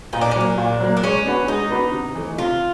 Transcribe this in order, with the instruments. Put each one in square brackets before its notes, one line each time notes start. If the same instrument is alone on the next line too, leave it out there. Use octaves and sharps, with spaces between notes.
[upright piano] A#2 [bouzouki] D#4
[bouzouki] D4
C#4
[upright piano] F#3 A#3 [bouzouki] D4
[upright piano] A#2
F#3 A#3
[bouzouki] D4
[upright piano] G#3 [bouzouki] C#4
[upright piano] B3 D4 F#4 B4
[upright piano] G#3 [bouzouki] D#4
[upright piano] B3 D4 F#4 B4
C3
E3 A3
[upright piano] C3 [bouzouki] F4